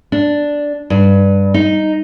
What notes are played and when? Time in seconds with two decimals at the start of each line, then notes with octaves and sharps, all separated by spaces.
0.12 D4
0.90 G2
1.54 D#4